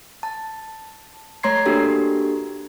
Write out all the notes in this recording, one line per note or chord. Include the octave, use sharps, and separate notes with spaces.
A5
A3 C#5 A#5 C6 G#6 C7
A#3 D4 F#4 G4 A4